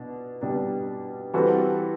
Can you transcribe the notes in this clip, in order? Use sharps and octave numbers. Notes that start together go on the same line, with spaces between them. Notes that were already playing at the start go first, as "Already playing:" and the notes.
Already playing: B2 D4
B2 G3 D4
E3 G3 C4 F#4 A4